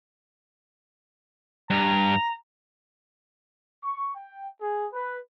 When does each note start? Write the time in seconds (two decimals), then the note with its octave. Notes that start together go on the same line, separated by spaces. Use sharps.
1.70 G2 A#5
3.83 C#6
4.15 G5
4.61 G#4
4.93 B4